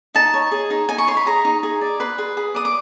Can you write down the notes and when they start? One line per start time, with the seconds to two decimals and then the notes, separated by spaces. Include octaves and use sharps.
0.15 D#4 A5
0.34 C#5
0.51 G#4
0.70 D#4
0.89 D#4 G#5
0.98 C#6
1.07 C#5 C6
1.17 B5
1.26 G#4 A#5
1.45 D#4
1.63 G#4
1.81 D5
2.00 B4 C6
2.18 G#4
2.37 G#4
2.55 D5 D#6
2.65 D6